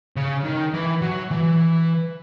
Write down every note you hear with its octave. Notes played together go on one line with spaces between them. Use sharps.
C#3
D#3
E3
F#3
E3